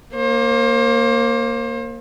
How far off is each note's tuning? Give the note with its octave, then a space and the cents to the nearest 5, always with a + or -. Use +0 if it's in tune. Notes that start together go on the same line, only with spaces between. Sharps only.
A#3 +0 C5 +35